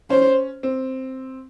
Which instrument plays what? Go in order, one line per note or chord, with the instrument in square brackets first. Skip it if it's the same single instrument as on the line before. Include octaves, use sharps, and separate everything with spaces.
[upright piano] C#4 [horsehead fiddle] C5
[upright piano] C4